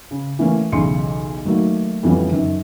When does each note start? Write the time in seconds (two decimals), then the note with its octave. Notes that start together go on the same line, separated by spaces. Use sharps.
0.11 C#3
0.39 E3 A3 A#3 C#4
0.72 B1 E2 C#3 C6 C#7
1.45 D#3 F#3 A3 A#3
2.03 F2 E3 F3 G3 B3 C#4
2.31 F#2 D#3